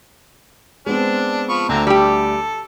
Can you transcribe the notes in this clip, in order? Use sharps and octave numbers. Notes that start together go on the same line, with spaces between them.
G#3 B3 C4 D4
F3 B5 C#6
D2 D3 A3 C4 A#5
G3 G4 A4